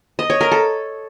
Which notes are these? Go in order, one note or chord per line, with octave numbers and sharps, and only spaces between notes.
D#5
C#5
A#4
A4